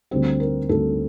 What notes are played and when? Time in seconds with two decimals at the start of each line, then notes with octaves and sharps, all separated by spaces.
0.11 D2 D3 G3 C4 C5
0.40 A#4
0.69 D2 D3 G3 C4 A4